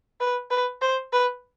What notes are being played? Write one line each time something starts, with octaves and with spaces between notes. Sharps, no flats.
B4
B4
C5
B4